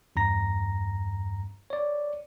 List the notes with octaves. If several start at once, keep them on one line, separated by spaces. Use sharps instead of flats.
E2 G2 A#5 A#6
C#5 D5